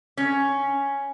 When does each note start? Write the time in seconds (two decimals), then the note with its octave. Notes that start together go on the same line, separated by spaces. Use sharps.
0.17 C#4